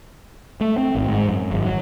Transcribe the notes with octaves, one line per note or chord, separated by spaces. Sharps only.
A3
C4
G#1
G#2
F#2
G#1
F#3